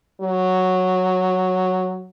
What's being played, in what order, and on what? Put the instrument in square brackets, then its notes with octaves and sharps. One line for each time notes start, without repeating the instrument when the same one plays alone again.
[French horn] F#3